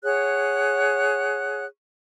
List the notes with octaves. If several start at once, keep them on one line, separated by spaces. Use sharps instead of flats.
G#4 C#5 F#5 F#6